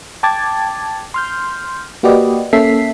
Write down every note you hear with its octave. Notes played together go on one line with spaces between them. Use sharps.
G5 A5 D6 G#6 A6
C6 F6 G6
A#3 F#4 G4 B4 D5 D#5
A#3 C#4 A4 E5 B6 C7